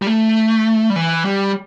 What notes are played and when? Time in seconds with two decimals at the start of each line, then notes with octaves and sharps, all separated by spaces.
0.02 G3
0.07 A3
0.90 G3
0.96 E3
1.25 G3